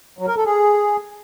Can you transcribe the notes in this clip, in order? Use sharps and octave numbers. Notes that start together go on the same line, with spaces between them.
F#3
A#4
A4
G#4